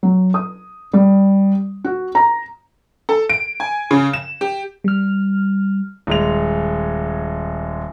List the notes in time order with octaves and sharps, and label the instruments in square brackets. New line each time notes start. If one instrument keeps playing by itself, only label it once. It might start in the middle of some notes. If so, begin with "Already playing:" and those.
[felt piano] F#3
D#6
G3
F#4
A#5
[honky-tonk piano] A4
D7
G#5
C#3
E7
G4
[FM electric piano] G3 F6
[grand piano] D#1 G#3 F7